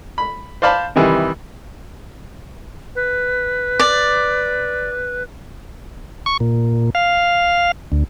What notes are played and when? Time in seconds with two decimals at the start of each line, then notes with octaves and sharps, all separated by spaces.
0.18 B5
0.62 C5 D5 F5 A5 B5
0.95 C3 D#3 E3 G3
2.96 B4
3.80 D5
6.26 C#6
6.40 A#2
6.95 F5
7.92 D2